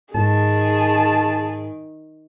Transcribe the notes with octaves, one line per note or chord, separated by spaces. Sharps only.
G#2 D#3 G#4 A5